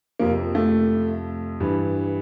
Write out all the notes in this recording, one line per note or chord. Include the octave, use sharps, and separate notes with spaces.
F2 C3 F3 A#3
A3
G2 E3